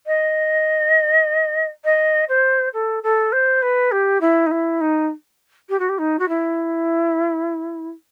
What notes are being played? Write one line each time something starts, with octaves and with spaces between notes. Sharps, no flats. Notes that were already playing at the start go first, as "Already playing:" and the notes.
D#5
D#5
C5
A4
A4
C5
B4
G4
E4
D#4
E4
D#4
G4
F#4
G4
D#4
F#4
E4